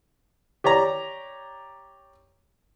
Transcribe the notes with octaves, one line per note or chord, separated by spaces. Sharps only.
G4 C#5 D5 A#5